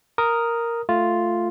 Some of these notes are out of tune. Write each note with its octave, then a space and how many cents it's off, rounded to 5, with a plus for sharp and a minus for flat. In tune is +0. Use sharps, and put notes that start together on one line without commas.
A#4 +0 D#6 +0
A3 +5 F4 +0